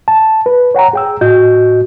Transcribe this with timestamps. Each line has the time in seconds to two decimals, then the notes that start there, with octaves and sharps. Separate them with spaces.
0.08 A5
0.46 B4
0.75 C#5 F#5 G5 A#5
0.93 G#4 G5 E6
1.21 A2 F#4 D#5 G6